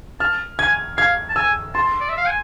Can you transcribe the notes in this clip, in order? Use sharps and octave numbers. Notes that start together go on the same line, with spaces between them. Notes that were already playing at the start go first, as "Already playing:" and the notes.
A5 F6
G#5 G#6
F5 G#6
A5
G#5 E6
A5 C6
D5
E5
F5
G#5